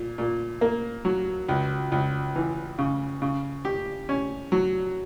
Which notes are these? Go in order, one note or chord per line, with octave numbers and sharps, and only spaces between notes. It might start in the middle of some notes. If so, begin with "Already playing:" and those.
Already playing: A#2
A#2
A#3
F#3
C#2
C#2
E3
C#3
C#3
G4
C#4
F#3